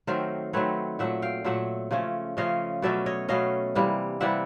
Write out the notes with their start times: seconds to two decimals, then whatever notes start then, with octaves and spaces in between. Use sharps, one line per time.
0.07 D#3 F#3 A3 C4 A#4 C5
0.53 D#3 F#3 A3 C4 B4 C#5
0.99 A#2 F#3 A3 E5 F#5
1.22 F5 G5
1.44 A#2 F#3 A3 E5 F#5
1.91 C#3 F3 A3 C#4
2.37 C#3 F3 A3 C#4 D#5 F5
2.82 B2 F#3 A3 C#4 D5 E5
3.06 C#5 D#5
3.28 B2 F#3 A3 C#4 D#5 F5
3.75 C3 E3 G3 A#3
4.20 C3 E3 G3 A#3 E5 F#5